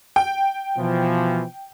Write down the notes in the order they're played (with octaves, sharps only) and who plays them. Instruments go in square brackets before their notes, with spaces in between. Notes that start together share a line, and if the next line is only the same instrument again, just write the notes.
[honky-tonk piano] G5
[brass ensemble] B2 E3 F3